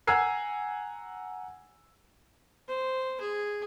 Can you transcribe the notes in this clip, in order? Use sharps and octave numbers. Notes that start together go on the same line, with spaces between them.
F#5 G#5 A#5 E6 G#6 C7
C5
G#4